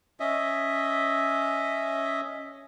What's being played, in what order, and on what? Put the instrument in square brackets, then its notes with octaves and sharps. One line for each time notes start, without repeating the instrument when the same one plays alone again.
[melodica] C#4 D#5 E5